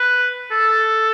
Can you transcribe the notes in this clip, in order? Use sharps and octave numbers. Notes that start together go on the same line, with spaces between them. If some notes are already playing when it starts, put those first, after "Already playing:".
Already playing: B4
A4